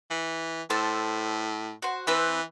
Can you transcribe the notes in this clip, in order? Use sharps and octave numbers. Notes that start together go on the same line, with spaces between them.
E3
A2 A4 C5
F#4 C5
E3 C4 B4 E6